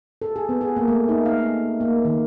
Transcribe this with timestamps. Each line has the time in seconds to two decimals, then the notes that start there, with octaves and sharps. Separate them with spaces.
0.22 A4
0.36 G#4
0.49 B3
0.61 G#4
0.76 A#3
0.88 A3
1.09 D#4
1.26 F5
1.81 A#3
2.05 D#3